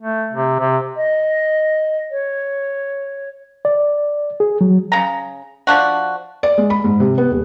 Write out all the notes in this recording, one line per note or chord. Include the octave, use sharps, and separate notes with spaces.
A3
C3
C3
D#5
C#5
D5
G#4
F#3
C#3 A#5
F3 D4 F#4
D5
G#3
B5
G#2
C3
B3
D#1